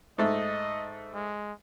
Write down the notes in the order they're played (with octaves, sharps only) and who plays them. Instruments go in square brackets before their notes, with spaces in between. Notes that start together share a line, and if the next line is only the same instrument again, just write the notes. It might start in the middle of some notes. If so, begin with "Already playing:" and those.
[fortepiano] G#2 A3 [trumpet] D#5
[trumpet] G#3